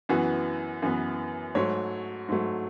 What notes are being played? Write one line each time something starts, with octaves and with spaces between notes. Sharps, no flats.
F#2 E3 B3 F#4
F#2 E3 B3
G#2 F#3 A3 C#5
G#2 F#3 A3